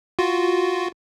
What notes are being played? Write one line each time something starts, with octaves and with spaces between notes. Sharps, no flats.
F4 F#4